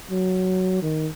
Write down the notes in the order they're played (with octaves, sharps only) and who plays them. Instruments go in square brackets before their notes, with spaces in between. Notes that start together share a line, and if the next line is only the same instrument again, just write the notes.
[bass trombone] F#3
D#3